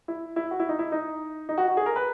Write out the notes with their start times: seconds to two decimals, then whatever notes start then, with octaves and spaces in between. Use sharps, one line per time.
0.08 E4
0.36 E4
0.51 F#4
0.60 E4
0.69 D#4
0.79 E4
0.92 D#4
1.49 D#4
1.58 F#4
1.68 F#4
1.77 G#4
1.86 A#4
1.96 B4